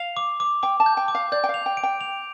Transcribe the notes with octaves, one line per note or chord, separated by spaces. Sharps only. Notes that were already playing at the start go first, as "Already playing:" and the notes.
Already playing: F5 F7
D6
D6
G5 D6
A5
G6
G5
D6
F5
D5 G6
G5
F5
F7
G5
D7
G5
F7